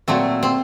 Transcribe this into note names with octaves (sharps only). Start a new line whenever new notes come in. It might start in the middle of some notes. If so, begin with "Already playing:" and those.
A#2 F#3 A3 C4
C4